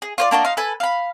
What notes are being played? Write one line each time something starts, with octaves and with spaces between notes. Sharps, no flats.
G#4
F4 C5 D5
A#3 D4 F#4 D#5
D#4 F5 C6
A4 B4 G#5
F5 B5